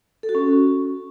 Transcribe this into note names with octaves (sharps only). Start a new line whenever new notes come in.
A4
F#4
C#4